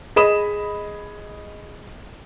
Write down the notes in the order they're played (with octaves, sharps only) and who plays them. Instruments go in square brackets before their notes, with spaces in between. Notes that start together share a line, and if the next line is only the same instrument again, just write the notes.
[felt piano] G#4 D#5 B5 D#6 E7